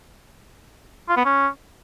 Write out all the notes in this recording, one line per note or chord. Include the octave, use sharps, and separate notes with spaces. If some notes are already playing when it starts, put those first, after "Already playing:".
F4
B3
C#4